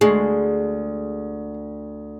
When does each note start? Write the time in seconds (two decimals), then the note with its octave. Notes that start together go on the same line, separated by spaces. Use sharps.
0.01 D2 G#3